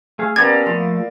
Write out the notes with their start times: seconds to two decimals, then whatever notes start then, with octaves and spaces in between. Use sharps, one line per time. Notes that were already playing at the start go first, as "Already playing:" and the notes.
0.19 A3 G#4 F5
0.36 A#3 B3 C#4 G4 A4 D5 G#6
0.66 F3 A3 C6